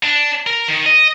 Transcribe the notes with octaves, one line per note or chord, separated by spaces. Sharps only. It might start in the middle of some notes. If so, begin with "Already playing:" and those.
D4
A#4
D#3
D#5